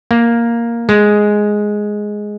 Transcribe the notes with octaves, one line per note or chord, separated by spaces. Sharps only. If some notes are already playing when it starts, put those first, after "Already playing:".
A#3
G#3